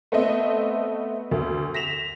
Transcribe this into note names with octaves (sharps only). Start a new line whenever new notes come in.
A3 B3 C4 D#5 E5
D2
A#6 B6 E7 F7